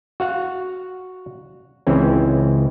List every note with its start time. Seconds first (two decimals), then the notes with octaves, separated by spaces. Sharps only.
0.20 F#4 F5 F#5
1.87 C#2 C#3 E3 C4 C#4